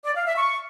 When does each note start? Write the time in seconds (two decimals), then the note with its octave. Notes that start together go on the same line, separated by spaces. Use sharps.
0.05 D5
0.16 F5
0.26 E5
0.37 C#6